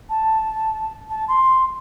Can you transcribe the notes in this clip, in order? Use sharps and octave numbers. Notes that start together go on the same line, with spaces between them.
A5
A5
C6